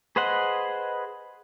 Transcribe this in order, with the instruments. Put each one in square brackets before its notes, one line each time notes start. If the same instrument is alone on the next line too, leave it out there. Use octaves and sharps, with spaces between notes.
[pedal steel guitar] G#4 B4 C5 D#5 F#5